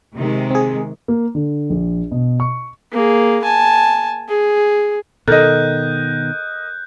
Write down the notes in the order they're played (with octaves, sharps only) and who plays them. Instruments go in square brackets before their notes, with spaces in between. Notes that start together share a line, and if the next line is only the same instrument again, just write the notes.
[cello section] C3 D#3 G#3
[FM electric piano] C4 G#4
[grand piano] A#3
D3
A#1
B2
C#6
[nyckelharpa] A#3 G#4
G#5 A5
G#4
[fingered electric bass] B2 D#3 [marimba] A4 [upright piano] A#4 D#5 [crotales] F#6 G6